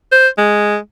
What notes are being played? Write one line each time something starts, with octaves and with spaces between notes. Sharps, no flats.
C5
G#3